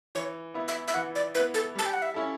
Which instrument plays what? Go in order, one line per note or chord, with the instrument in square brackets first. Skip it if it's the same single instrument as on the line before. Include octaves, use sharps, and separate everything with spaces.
[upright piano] E3 [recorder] C#5
[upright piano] B3 E4
[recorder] E5
E5
[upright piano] E3 [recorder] F#5
[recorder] D5
[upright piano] B3 E4 [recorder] B4
[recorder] A4
[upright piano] G3 [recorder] A5
[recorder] G5
F#5
E5
[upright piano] C#4 E4 A4